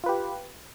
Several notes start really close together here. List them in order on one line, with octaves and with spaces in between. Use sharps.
F4 B4 G4